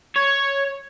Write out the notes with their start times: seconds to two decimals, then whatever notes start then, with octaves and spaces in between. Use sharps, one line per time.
0.16 C#5